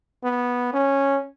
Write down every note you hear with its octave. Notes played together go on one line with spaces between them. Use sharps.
B3
C#4